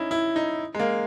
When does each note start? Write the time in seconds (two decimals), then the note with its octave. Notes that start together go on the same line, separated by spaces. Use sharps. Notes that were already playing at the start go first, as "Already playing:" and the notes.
Already playing: C#4 D#4 E4
0.11 E4
0.36 D#4
0.75 G#3
0.80 A#3